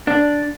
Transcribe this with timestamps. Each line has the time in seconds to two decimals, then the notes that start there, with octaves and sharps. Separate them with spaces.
0.07 D4